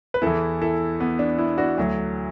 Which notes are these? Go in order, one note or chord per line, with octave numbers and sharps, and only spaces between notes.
B4
E2 E3 E4 A4
E4 A4
B3
D4
B3 E4
D4 F#4
D2 D3 F#3